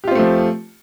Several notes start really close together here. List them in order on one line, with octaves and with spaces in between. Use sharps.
G4 F4 C4 A3 F3